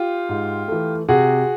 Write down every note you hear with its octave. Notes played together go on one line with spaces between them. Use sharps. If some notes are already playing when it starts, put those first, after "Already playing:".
Already playing: F4 G4
G#2
E3 A3
C3 F#4 G#4